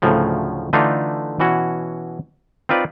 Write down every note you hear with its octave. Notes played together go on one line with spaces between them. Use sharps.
D2 A2 C#3 F3 F#3
D3 E3 A3 D4 D#4 F4
B2 E3 C#4 F#4
C4 D#4 F4 B4 D5